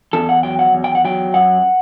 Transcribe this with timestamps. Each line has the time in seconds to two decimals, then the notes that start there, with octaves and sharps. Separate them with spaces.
0.13 E2 A4
0.29 F#5
0.43 F#3 G5
0.59 F#5
0.74 E2
0.84 G5
0.95 F#5
1.05 F#3 G5
1.34 F#2 F#5